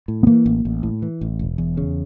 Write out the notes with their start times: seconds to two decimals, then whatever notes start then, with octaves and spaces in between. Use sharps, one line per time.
0.08 A2
0.23 B3
0.27 E3 A#3
0.46 A1
0.65 A1
0.83 A2
1.02 E3
1.21 A1
1.39 E1
1.58 E2
1.77 C#3